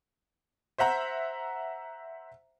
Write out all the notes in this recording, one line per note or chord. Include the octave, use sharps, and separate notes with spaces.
C5 E5 F#5 A#5